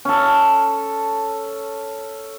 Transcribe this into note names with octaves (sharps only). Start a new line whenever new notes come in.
C#4 A4